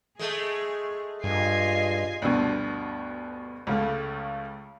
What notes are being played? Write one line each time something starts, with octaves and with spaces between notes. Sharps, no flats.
G#3 A3 G#4
G2 F4 D#5 G#5 C7
D2 G2 B2
C#2 C#3 A3